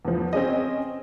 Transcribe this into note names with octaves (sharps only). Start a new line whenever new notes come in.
E2 F3
C4 C#4 G#4 D#5